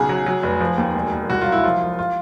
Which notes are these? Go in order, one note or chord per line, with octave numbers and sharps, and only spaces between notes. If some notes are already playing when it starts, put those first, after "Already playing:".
Already playing: B1 C#3 G#4
F#3
F#3
F1
F3
D#2
E1
E1
C2 F#4
F#3 F4
E4
F3 F4
F3
F4